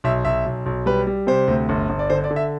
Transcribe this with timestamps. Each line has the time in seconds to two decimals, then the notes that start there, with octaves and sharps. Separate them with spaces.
0.04 B1 E5
0.25 B1 E5
0.46 B1
0.66 B1
0.86 G3 B4
1.07 G3
1.27 C3 C5
1.48 D2
1.69 G1
1.89 G1
1.99 D5
2.10 D3 C5
2.24 D5
2.31 D3
2.36 E5